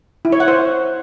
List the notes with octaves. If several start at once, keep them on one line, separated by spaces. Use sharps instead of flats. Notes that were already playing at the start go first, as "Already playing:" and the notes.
E4
C#5
F#5
C5